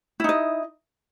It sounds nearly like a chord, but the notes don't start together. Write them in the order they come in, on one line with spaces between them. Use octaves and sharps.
E4 D#4 D#5